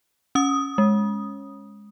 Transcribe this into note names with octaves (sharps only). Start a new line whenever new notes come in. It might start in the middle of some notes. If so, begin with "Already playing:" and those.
C#4 D#6
G#3